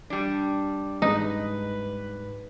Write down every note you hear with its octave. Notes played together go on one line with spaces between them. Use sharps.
G3 D4
G#2 D#4 B4